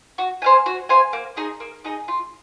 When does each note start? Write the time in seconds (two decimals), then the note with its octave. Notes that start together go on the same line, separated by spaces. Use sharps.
0.18 F#4
0.42 C5 F5 G#5
0.66 F#4
0.89 C5 F5 G#5
1.13 A#3
1.36 D#4 G#4 D#5
1.60 A#3
1.85 D#4 G#4 D#5
2.08 F4